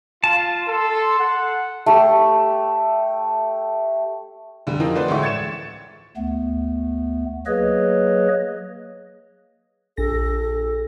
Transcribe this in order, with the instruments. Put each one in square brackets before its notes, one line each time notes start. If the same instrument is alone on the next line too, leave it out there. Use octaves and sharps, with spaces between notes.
[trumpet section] F4 [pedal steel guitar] A5
[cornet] A4 [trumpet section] C6
[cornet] F#5
[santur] A3 G4
[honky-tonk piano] F1 D3 G3
E3 F3 C4 D#4 A#4
A3 B4 C5 D5 F#5
A1 D2 G#3 E5 G5 C#6
G#6 A6 C#7 E7
[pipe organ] D2 A3 B3
F#3 A#3 G#4 B4 C#5 D#5
[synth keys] A#1 A#6 [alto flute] A4